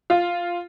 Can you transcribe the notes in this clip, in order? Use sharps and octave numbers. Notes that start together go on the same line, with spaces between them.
F4